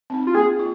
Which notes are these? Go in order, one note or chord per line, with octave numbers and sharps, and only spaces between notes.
C4 D#4
F4
A#3 G#4
F4